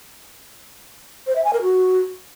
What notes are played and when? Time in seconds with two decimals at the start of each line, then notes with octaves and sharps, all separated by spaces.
1.27 C5
1.36 E5
1.44 G#5
1.53 A#4
1.62 F#4